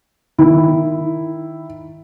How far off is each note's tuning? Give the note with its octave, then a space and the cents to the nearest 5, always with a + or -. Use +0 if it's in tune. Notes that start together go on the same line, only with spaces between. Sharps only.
D#3 +0 E4 +0